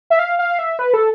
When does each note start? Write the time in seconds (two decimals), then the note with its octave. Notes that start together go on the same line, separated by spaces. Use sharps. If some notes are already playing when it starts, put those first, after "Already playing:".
0.10 E5
0.19 F5
0.39 F5
0.59 E5
0.79 B4
0.94 A4